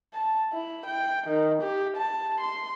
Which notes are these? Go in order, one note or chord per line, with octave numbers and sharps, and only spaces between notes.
A5
E4
G5
D#3
G4
A5
C6